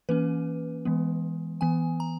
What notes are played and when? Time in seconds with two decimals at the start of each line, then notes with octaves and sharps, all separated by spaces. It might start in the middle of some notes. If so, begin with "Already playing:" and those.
0.09 E3 A#3 C#4 B4
0.85 E3 G#3 B3
1.61 E3 B3 G#5
2.00 A#5